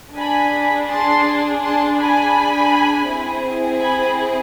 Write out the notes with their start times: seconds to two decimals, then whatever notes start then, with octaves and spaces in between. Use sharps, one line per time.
0.16 D4 G#4 G#5 B5
0.89 A5 C6
1.62 A5 C6
1.99 G#5 B5
3.07 C4 E4 G#4
3.80 G#5 B5